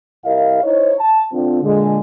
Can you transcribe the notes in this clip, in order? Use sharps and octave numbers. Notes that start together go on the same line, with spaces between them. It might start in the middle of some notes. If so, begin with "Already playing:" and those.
C2 E4 G4 A#4 D#5 F5
D#4 E4 C5 C#5
A5
D3 C4 F4
A#2 D3 G#3